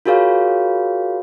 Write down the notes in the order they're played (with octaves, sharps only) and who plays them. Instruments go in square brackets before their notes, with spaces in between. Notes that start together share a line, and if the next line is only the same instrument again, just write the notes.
[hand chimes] F4 F#4 G#4 A#4 C#5 F5